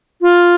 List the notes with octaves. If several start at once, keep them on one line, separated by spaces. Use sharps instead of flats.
F4